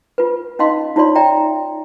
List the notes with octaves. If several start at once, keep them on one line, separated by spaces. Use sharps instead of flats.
F4 B4
C#4 D#4 D#5 F5 C6
D#4 F4 C#5 D5 C6
D5 E5 G5 A#5